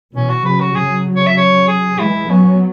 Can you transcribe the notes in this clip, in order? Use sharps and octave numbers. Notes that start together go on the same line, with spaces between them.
B2 E3 C#4
F#4
C#3 F#3 B4
F#4
C#3 F#3 G#4
C#5
E5
C#5
G#4
E3 G#3 E4
F#3 B3 C#4